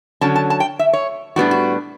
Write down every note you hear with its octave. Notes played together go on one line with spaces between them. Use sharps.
D3 F#3 C#4 A5
A5
A5
G5
E5
C#5
A2 G3 B3 D4 F#4
F#4